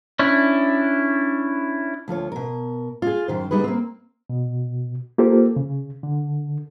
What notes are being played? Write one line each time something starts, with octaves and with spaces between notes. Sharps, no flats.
C#4 D4 E4
D2 F3 F4 C#5
B2 A#4
F4 G#4
F#2 D#3 C5
D2 A#2 G3 D#4 G#4 B4
A#3 C4
B2
A#3 F4 G4 A4 C5
C#3
D3